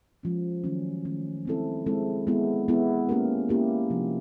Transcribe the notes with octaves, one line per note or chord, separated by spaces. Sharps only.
F3 G#3 C#4
D#3 F#3 A3 C#4
D#3 F#3 A3 C#4
G#3 C4 E4 A4
G#3 C4 E4 A4
G#3 B3 E4
G#3 B3 E4
A#3 C#4 E4 G4 A#4
A#3 C#4 E4 G4 A#4
C3 F3 A3 D4